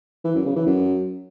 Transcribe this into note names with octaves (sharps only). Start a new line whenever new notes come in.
E3
F#2
C#3
E3
F#2